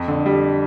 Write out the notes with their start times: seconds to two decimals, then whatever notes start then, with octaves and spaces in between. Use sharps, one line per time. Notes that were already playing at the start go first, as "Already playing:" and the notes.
Already playing: F2
0.08 D3
0.26 G3